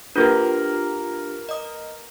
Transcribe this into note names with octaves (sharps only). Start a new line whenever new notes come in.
A#3 D4 F4 G4 B4
D#5 D#6